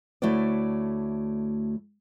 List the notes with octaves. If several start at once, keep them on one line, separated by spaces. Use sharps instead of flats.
D2 A3 E4 F#4 C#5 D5